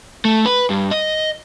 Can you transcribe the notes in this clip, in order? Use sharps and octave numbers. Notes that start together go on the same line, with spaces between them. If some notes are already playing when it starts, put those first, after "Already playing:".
A3
B4
G2
D#5